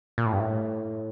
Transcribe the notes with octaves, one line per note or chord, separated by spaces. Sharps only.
A#2
A2
G2
A2